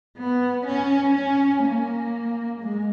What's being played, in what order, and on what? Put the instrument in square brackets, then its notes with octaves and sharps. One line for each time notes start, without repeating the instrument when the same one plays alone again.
[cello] B3
C#4
C#4
A#3
G#3